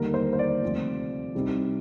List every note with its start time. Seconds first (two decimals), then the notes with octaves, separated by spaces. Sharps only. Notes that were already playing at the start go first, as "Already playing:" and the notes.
Already playing: D#2 D3 G3 A#3 D#4 A#4
0.14 C5
0.33 C5
0.39 D5
0.62 D2 C3 F3 C4
1.35 C2 C3 G3 C4 D#4